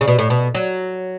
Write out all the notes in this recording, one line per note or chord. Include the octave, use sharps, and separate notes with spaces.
C#3
B2
A2
B2
F#3